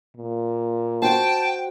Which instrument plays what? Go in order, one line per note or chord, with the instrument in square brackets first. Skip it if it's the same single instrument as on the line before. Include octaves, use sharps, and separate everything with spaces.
[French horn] A#2
[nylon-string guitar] F#4 C5 [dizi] G5 [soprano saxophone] A5